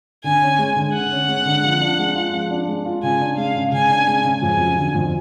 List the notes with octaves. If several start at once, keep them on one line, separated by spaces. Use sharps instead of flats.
D3 G#5
C#4
G#3
D3
D3 F#5
C#4
G#3
D3
F3
D4
G#3
F4
F3
D4
G#3
F4
C#3 G#5
D4
G#3 F5
C#3
C#3 G#5
D4
G#3
C#3
F2 G#5
F#3
D3
F2